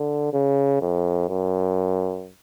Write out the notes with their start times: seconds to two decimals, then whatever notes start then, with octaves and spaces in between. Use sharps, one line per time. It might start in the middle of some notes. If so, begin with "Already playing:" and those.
Already playing: D3
0.33 C#3
0.81 F2
1.29 F#2